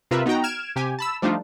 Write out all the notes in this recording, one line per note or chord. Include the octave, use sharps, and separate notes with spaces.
C3 F4 A#4 B4 E5
B3 D#4 F#4 G5 A#5
F6 G#6 D7 E7
C3 G4 G#5
A5 B5 E6
F3 G3 A3 D4 D#4 F4